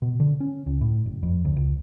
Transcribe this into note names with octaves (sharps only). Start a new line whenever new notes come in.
B2
D3
C#4
C#2
A2
F#1
F2
D2
C#2